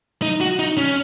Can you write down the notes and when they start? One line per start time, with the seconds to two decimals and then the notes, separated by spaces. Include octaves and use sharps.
0.22 D#4
0.41 F#4
0.59 D#4
0.77 C#4